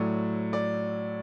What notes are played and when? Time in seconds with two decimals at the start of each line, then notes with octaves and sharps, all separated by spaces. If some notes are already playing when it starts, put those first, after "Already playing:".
Already playing: A2 F#3 A3 D5
0.53 D5